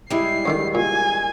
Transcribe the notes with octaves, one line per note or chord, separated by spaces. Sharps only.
G3 G#3 E4 E5 C7
G2 D3 D#3
A#2 G#5